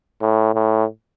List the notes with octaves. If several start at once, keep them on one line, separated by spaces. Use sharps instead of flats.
A2
A2